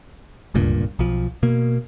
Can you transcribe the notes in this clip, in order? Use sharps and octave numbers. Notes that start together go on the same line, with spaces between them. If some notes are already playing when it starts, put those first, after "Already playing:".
D1 C#2 G2 A#2
B1 F3
B2 A#3